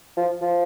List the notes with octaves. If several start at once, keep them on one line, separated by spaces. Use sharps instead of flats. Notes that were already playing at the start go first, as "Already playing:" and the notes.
F3
F3